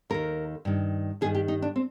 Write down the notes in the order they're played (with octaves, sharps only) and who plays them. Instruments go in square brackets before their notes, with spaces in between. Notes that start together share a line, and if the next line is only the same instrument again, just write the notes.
[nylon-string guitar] D#2 D#3 A#4
G2 D#3
G2 D#3 G#4
G4
D#4
D4
C4